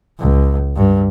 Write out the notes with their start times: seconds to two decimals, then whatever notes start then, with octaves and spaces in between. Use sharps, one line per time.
0.19 C#2
0.76 G2